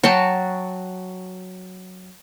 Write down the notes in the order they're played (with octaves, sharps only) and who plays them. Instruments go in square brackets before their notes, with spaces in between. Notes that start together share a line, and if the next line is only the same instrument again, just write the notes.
[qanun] F#3 F#4 G5 A5